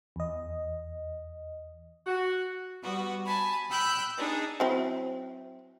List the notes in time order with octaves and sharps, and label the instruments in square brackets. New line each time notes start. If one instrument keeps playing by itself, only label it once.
[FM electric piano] E2 D#5
[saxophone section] F#4
[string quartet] G3 B3 F#4
G#5 A5 B5
G5 B5 E6 F#6 G6
D4 D#4 G#4
[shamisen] F#3 C4 E4